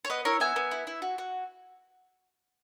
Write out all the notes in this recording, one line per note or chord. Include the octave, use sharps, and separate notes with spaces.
C#5
B3 B4 D#5
E4 A#4 C#5
B3 E5 G#5
B3
E4
E4
F#4
F#4